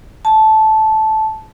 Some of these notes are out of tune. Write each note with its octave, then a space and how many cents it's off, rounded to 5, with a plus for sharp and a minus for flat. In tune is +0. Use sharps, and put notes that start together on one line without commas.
A5 -10